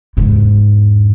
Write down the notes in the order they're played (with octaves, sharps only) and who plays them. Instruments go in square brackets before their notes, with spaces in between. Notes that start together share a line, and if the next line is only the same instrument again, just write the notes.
[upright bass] E2 G#2